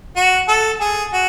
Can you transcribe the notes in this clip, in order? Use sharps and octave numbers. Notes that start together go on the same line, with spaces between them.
F#4
A4
G#4
F#4